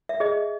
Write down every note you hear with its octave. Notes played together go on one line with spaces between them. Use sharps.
E5
G#4 D#5